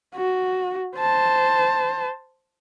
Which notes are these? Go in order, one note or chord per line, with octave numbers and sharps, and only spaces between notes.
F#4
C5 A5